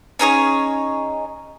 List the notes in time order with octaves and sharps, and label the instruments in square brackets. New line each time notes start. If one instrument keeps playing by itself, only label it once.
[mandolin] C#4 D#4 G#4 C#5